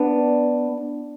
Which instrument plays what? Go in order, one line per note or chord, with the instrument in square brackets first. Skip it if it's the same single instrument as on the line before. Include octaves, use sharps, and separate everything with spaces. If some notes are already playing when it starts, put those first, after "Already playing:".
Already playing: [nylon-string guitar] B3 D4